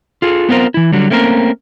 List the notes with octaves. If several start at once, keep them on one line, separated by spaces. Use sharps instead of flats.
F4 G#4 A4
B3 C4 F4 A#4 C5
E3 E4
D3 F#3 G3
A3 A#3 C4 C#4 A#4